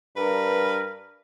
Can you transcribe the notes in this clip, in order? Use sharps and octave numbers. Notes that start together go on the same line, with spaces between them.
G2 A#4 B4